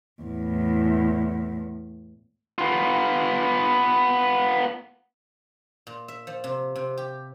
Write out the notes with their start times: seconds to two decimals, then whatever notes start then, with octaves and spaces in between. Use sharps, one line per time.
0.23 E2 A2
2.58 B3 F4
5.87 A#2
6.08 E5
6.27 F3
6.44 C3
6.76 C3
6.98 G4